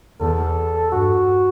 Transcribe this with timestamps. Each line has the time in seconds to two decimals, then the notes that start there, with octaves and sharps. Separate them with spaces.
0.21 E2 A4
0.92 G2 F#4